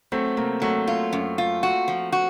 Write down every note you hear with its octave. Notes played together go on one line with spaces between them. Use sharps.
F#3 A3 C4
C3 A#3
F#3 A3
F4
F#2
F4
F#4
F3
F#4